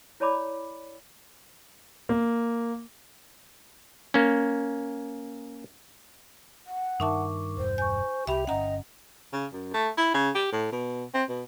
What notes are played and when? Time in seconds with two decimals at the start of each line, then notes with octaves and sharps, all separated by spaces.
0.20 E4 C#5 D5 A5 B5 D6
2.09 A#3
4.14 A#3 C#4
6.66 F#5
7.00 G2 D#3 D#4 A#4 E5 A5 C#6 D6
7.57 E1 G2 C5
7.78 G#5 C#6 G6
8.27 C2 G4 E5 G5 B5 F7
8.47 G1 C#4 D#5 F#5 A#5
9.33 C#3
9.53 F#2
9.74 A3
9.98 E4
10.14 C#3
10.35 G4
10.52 A2
10.72 B2
11.14 C4
11.29 B2